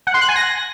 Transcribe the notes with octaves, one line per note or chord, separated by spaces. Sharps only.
F#5
C6
F#6
G#5
A#6